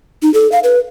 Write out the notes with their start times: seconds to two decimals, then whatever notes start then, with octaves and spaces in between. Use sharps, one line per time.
0.23 D#4
0.34 A4
0.52 F5
0.64 B4